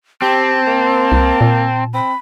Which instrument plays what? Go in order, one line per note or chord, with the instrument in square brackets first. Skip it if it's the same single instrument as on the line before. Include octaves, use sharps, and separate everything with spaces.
[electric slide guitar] C4 [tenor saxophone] G4 [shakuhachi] A5
[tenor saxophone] A#3
[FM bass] C2
A#2
[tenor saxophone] C4 [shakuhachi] B5